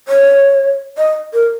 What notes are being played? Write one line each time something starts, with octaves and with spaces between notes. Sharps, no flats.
C#5
D#5
A#4